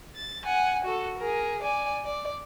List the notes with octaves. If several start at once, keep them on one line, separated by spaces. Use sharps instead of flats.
A6
F#5 G#5
F#4 A4
G#4 A#4
D5 G#5
D5